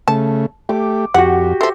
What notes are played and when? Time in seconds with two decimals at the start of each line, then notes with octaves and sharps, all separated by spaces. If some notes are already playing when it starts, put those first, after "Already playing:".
0.08 C#3 A3 A5
0.69 A3 G4 D6
1.14 F2 F#4 G4 F#5
1.61 F3 A4 E5 C6